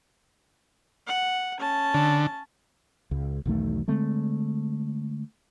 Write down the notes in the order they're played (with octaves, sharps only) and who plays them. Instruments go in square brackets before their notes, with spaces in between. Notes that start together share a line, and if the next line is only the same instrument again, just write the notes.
[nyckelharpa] F#5
C#4 A5
[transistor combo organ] D3
[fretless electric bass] C#2
B1 E2 D#3 A3
D3 G#3 A3 C4